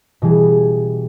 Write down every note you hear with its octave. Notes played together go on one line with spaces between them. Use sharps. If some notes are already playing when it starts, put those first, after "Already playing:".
B2 E3 G3 G#4